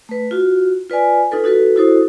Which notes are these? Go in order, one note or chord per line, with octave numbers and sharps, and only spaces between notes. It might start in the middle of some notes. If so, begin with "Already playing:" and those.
A3 B4
F4 F#4
F4 B4 D5 G#5
D#4 F4 A4 B4
D#4 F#4 A4 B4
E4 F#4 A4 C5 D#6